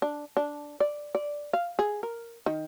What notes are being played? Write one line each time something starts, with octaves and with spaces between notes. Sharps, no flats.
D4
D4
D5
D5
F5
G#4
A#4
D#3